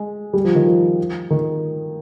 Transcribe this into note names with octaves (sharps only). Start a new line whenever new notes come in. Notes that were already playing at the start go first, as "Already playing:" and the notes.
Already playing: G#3
G3
F3
D#3
F3
D#3